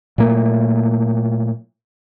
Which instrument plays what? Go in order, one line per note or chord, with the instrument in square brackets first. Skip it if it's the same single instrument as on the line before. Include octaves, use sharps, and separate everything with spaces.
[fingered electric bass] A#2 F#3 A3 A#3